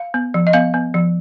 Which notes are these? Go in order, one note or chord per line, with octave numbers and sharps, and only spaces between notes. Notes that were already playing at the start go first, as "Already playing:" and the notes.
Already playing: F5
B3
F3
D#5
B3 F5
B3
F3